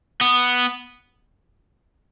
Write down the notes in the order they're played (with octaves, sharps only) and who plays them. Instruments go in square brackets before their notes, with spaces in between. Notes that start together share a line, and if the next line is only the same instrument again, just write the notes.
[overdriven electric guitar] B3